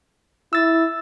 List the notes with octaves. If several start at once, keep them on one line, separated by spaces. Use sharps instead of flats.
E4 E6 A6